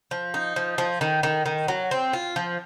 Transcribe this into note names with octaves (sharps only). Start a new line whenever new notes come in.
F3
D#4
F3
F3
D#3
D#3
D#3
F#3
C4
F4
F3